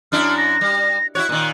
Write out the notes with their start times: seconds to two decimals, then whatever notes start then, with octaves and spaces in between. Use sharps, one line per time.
0.12 F#2 D4 E4 F6
0.38 A#6
0.61 G3
1.15 E4 F#4 C#5 F#6
1.29 A#2 D#3